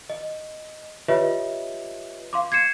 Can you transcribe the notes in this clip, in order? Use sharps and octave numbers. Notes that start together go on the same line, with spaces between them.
D#5
F4 G4 B4 C#5 D#5 E5
F5 C6 D6
G#6 C7 C#7 E7